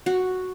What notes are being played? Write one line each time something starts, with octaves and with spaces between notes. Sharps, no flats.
F#4